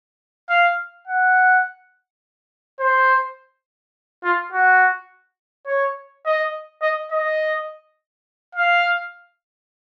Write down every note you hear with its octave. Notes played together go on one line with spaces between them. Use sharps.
F5
F#5
C5
F4
F#4
C#5
D#5
D#5
D#5
F5